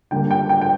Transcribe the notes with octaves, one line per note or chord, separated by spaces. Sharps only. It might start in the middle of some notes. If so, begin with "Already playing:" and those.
D3 G3 A#3 G5
G5
G5
G5